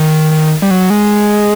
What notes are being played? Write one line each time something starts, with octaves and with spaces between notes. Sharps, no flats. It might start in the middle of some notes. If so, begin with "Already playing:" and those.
Already playing: D#3
D#3
G3
F#3
G#3